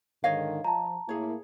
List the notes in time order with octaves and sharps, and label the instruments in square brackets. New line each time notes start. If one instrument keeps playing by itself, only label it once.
[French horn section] G#2 D3 D#3 [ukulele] C#5 D#5 F5
[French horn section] F3 [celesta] A5 A#5
[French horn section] A2 A#3 E4 [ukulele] G#4 C#5